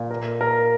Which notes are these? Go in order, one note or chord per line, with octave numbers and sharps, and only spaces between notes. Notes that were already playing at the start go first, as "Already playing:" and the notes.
Already playing: A#2
A#4
A#4